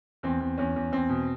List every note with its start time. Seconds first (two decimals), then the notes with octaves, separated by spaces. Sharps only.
0.23 E2 C4
0.40 E2
0.58 E2 C#4
0.76 E2
0.92 E2 C4
1.09 B2